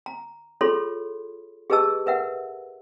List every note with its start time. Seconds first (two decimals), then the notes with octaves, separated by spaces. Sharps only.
0.06 A#5
0.61 F4 G#4 A4 C#5 B5 C6
1.70 G4 G#4 B4 D#5 A5 E6
2.06 A#4 B4 E5 F#5